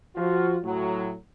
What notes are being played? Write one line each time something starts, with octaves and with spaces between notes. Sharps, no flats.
F3 F4 F#4
A2 F#3